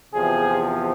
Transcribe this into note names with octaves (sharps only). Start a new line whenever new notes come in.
E2 C3 F3 G#4